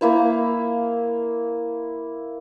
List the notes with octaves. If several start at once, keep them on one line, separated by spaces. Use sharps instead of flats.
A#3 E4 C5